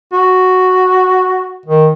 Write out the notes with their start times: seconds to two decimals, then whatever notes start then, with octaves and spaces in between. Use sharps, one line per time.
0.13 F#4
1.66 D#3